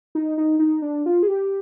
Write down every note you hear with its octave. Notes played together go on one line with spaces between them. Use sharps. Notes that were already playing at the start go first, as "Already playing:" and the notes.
D#4
D#4
D#4
D4
F4
G#4
G4